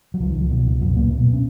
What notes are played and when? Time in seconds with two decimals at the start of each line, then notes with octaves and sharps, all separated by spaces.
0.14 F#3
0.20 C#2 F3
0.29 D#3
0.35 C#2 F3
0.50 B2
0.67 C#2
0.81 F#2 B2 F#3
0.96 C#2 A#2 A#3
1.12 B2
1.33 C#4